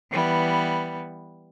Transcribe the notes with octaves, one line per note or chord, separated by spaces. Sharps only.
E3 G3 B3